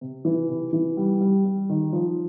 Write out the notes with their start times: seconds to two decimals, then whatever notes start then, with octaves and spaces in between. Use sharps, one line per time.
0.01 C3
0.25 E3
0.49 C3
0.73 E3
0.97 G3
1.20 G3
1.45 G3
1.69 D#3
1.93 F3